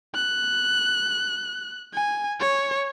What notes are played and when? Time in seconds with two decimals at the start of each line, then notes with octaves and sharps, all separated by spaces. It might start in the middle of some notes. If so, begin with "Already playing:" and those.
0.15 F#6
1.94 G#5
2.40 C#5